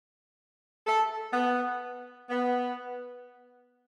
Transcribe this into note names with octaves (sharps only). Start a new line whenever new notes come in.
A4
B3
B3